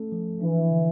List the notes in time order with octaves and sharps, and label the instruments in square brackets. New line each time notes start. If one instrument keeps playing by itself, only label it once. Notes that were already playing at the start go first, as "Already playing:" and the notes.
Already playing: [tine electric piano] A3 C#4 A4
F3
[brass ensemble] E3 [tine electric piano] D4
[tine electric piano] D3